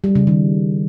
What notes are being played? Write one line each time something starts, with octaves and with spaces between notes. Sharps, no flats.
G3
C#3
D#3